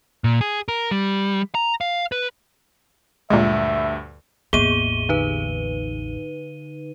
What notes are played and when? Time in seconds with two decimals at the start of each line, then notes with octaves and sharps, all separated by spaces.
0.24 A#2
0.41 G#4
0.68 A#4
0.91 G3
1.55 A#5
1.81 F5
2.12 B4
3.30 D2 G2 A#2 G#3 E5
4.53 A1 E2 A#3 B3 G#4 D#7 G7
5.09 D3 D#4 B4